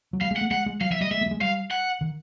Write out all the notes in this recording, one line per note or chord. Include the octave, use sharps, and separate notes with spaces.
F#3
G3 F5
G#3
F#5
A3
G#3 F#5
G#3
F#3 F5
F3 E5
G3 D#5
G#3 E5
A3
G3
G#3
G3 F5
F#5
D#3